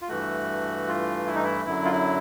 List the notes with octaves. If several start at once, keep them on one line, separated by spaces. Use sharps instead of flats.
F4
G2 E3 A3 F#4
F4
E4
D#4
E4
F#2 D3 F#3 E4
F4
E4